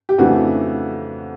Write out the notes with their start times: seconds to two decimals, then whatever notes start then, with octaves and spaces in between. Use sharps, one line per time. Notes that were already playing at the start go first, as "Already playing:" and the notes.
0.09 G4
0.18 F2 C#3 E3 A3 D4 F#4